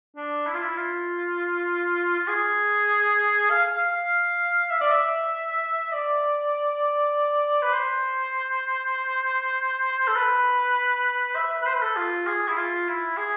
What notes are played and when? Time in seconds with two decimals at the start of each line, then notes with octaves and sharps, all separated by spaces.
0.17 D4
0.47 E4
0.54 F4
0.62 E4
0.77 F4
2.18 F4
2.28 G#4
3.50 F5
3.76 F5
4.70 E5
4.81 D5
4.91 E5
5.92 D5
7.62 B4
7.73 C5
10.08 A4
10.16 B4
11.36 E5
11.62 B4
11.67 C5
11.74 B4
11.82 A4
11.96 F4
12.27 G#4
12.48 E4
12.57 F4
12.88 E4
13.17 G#4